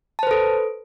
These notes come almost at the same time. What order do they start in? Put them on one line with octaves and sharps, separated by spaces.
A5 C5 B4 A4